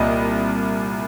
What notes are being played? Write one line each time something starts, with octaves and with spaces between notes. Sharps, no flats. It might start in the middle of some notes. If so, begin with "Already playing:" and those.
Already playing: C2 A#2 G3 D#5